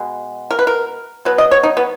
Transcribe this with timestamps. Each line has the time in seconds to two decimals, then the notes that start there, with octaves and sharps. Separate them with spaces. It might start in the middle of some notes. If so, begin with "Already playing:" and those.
Already playing: B2 G#3 B3
0.51 A#4
0.59 B4
0.67 A#4
1.25 B2 F#3 B3 B4
1.38 D#5
1.51 C#5
1.63 D#4
1.77 B3